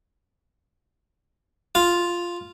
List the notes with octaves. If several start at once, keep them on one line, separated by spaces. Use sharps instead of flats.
F4